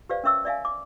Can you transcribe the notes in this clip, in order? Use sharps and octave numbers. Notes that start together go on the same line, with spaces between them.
G4 B4 C5 D5 F5
C#4 A#4 C#5 E5 C#6 E6
D5 E5 F5 G#5
D6